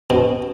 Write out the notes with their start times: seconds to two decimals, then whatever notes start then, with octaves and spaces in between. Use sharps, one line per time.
0.10 B2